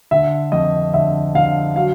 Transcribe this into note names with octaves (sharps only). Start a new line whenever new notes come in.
D3 E5
F2 D#5
D3 E5
D3 F5
F#3 F5